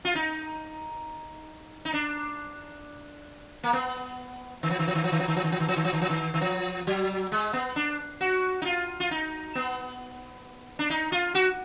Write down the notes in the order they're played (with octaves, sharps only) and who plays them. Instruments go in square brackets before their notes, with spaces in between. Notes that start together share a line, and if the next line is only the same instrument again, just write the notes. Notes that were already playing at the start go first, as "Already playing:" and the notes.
[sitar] F4
D#4
D#4
D4
A#3
B3
D#3
F3
D#3
F3
D#3
F3
D#3
F3
D#3
F3
D#3
F3
D#3
F3
D#3
F3
D#3
F3
D#3
D#3
F3
F#3
G#3
B3
D4
F#4
D#4
F4
F4
D#4
B3
D4
D#4
F4
F#4